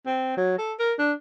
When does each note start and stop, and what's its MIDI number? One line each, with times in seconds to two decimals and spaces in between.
0.06 0.32 60
0.37 0.56 54
0.58 0.73 69
0.79 0.93 70
0.99 1.12 62